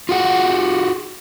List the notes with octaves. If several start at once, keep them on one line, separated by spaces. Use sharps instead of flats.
F4 F#4 G#4 F#5